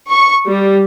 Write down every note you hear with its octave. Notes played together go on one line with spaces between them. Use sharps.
C#6
G3